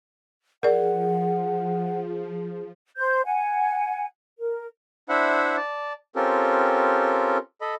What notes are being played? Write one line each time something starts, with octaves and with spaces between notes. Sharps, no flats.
F3 G#4 A#4 D5 F#5
C5 G6
F#5 G#5
A#4
D4 E4 C5 E5 F#5 B5
D5 A5
C4 C#4 F4 G4 A4 A#4
A4 D#5 B5